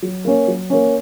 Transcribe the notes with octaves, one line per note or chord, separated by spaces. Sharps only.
F#3
A#3 C#4
F#3
A#3 C#4